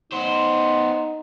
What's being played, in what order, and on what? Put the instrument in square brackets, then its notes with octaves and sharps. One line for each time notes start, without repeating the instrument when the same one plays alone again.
[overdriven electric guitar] B3 C5 [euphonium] D#4